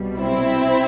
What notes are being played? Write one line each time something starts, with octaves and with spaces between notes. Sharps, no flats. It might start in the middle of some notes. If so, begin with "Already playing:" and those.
Already playing: C2 B2 G3
C4 E4